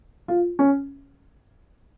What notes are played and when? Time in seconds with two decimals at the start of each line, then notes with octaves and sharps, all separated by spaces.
0.28 F4
0.59 C#4